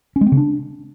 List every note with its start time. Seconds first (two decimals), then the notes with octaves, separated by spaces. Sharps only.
0.16 C#4
0.21 G#3
0.27 C4
0.32 C#3
0.37 D4